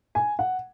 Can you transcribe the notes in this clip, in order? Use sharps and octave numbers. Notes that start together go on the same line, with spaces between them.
G#5
F#5